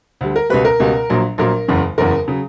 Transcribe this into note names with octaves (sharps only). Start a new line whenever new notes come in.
D2 D3 G3
A#4
C#2 B2 G3 B4
A#4
C#2 B2 G3
A#1 A#2 F#3
A#1 A#2 F#3 A#4
F#1 E2 C#3
F#1 E2 C#3 A#4
C#3 F#3